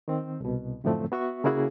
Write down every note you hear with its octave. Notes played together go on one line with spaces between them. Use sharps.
D#3 C4
C2 B2
F#2 A2 D3 F3 A3 C4
B3 F#4 E5 C#6
C#3 A#3 C#4 E4 F#4 G#4